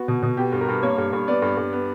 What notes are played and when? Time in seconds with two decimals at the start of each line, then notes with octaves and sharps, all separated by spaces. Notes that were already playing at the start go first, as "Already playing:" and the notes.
Already playing: B3 F#4
0.08 B2
0.22 B2
0.37 B3 G4
0.53 G2
0.61 A#4
0.68 G2
0.83 A#3 C#5
0.98 G2
1.13 G2
1.28 B3 D5
1.42 G2
1.57 G2
1.73 B3